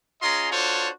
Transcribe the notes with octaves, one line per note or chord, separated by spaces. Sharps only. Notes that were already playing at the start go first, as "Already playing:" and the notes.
C#4 F4 G#4 D#5 A#5 C6
D4 F4 F#4 A4 C5 C#5